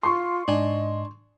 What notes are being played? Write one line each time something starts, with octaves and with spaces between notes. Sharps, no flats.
F4 C6 C#6
G#2 D4 D#5 G#5